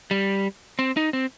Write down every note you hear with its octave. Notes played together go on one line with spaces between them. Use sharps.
G3
C4
D#4
C4